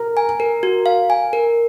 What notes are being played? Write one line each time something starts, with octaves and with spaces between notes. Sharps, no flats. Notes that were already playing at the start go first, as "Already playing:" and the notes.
Already playing: A#4
G#5
A#4
F#4
F5
G#5
A#4